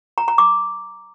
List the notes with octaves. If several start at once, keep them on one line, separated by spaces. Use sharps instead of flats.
A#5
A#5
D6